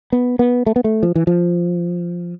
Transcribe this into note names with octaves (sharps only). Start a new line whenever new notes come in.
B3
B3
A3
B3
A3
F3
E3
F3